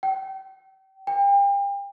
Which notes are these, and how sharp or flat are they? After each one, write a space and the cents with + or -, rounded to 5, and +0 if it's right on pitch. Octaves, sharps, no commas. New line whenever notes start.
G5 -35
G5 +35